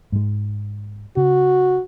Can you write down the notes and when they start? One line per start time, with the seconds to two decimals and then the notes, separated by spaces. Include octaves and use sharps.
0.12 G#2 G#3
1.17 C#3 F#4